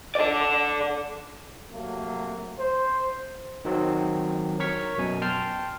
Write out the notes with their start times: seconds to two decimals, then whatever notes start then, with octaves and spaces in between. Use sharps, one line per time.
0.15 A4 D5
1.71 C3 F#3 A3 A#3
2.58 C5
3.65 D#3 F#3 C4
4.60 A#4 C#5 C#6 B6
4.98 F#2 B2 G#5
5.22 G5 A5 C6 F6